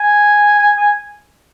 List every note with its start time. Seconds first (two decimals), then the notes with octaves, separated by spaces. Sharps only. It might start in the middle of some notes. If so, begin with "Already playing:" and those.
Already playing: G#5
0.59 G#5
0.77 G#5